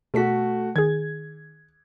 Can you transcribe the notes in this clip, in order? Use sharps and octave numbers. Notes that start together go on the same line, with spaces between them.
B2 A3 F#4 A4 B6
D#3 G#4 G#6